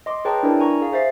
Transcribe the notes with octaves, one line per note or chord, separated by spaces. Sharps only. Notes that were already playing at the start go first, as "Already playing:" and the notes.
D#5 C6 D6
G#4 B4 C#5 G5 A5 A#5
D4 E4 A#4 D5
G#5 A#5 C#6
G#4 F5
G#4 C5 E5 F5 A6 C7